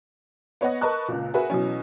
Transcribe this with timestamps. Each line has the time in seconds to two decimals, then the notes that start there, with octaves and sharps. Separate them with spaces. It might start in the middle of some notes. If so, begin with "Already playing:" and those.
0.61 B3 C#5 D#5 F#5 A#6
0.81 A#4 B4 D#5 A5 C#6 F#6
1.08 C#2 A#2
1.34 F#4 G#4 A#4 B4 E5
1.50 B2 E3 F#3 C#4